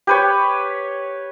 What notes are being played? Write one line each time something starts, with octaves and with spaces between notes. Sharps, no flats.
G4 B4 C#5